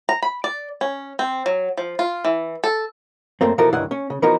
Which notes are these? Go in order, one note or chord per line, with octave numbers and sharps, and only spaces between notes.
A#5
B5
D5
C#4
C4
F#3
F3
F4
E3
A4
F#2 A3 A#3 C4
B2 E3 F3 E4 A4 A#4
C#2 G2 D#3 E3 F#5
C#4
C#3
E3 F3 B3 D#4 F#4 A#4